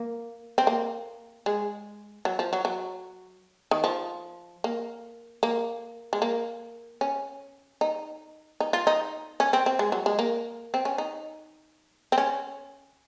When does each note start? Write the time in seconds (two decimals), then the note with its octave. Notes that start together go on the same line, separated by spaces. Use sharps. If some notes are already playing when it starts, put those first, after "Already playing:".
Already playing: A#3
0.58 C4
0.67 A#3
1.46 G#3
2.25 F#3
2.39 F3
2.53 F#3
2.65 F#3
3.71 D#3
3.84 F3
4.64 A#3
5.43 A#3
6.13 G#3
6.22 A#3
7.01 C#4
7.81 D#4
8.60 D#4
8.73 F4
8.87 D#4
9.40 C#4
9.53 C4
9.66 C4
9.79 G#3
9.92 F#3
10.06 G#3
10.19 A#3
10.74 C4
10.85 C#4
10.98 D#4
12.12 C4
12.18 C#4